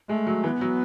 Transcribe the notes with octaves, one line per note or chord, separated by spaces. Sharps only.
G#3 A3
F#3
E3 B3
F#3